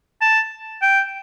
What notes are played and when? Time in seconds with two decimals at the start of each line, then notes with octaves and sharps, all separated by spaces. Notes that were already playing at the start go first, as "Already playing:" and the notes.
0.21 A5
0.82 G5